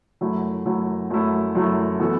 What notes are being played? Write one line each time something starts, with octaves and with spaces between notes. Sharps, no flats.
F#2 F#3 A3 E4
F#2 F#3 A3 E4
F#2 F#3 A3 E4
F#2 F#3 A3 E4
E3 B3 F#4 A4